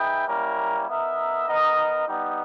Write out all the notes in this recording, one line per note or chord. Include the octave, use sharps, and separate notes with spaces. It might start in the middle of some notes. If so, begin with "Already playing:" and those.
Already playing: D#4 G#4 B4 E5 G5
G3 A#3 C#4 E4 A#4
B3 D#4 A#4 E5
B3 D#4 A#4 D#5
G3 B3 D#4